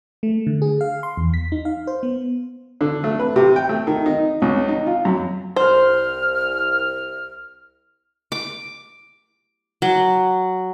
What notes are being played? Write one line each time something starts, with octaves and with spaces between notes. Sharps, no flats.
A3
D3
G#4
F5
C6
E2
B6
D#4
F5
C5
B3
D3
A3
B4
C3
G5
A3
D#3
D#4
C#2
D#4
F4
F#2
C2 C5 F6
D6
F#3